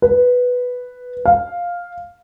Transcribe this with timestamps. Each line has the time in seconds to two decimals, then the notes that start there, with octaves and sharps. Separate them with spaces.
0.02 B4
1.26 F5